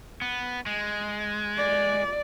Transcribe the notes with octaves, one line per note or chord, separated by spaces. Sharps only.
B3
G#3
D5